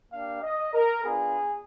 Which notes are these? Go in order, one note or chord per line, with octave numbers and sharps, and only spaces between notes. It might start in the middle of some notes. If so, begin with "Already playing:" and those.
A#3 D4 G4 F5
D#5
A#4
B3 D4 F4 G#4